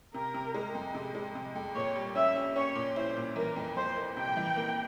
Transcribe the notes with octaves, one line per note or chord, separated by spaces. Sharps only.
C3 A#4
C3
G#3
F2
C3
G#3
C3
F2
A#2 C#5
G3
C#4 E5
C#4
C#4 C#5
A#2
E4 C5
A#2
E3 A#4
F2
F2 C5
A#3
C3 G5
E3
A#3